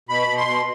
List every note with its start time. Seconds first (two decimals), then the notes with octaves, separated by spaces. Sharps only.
0.09 B2 B5
0.28 B2
0.37 C6
0.47 B2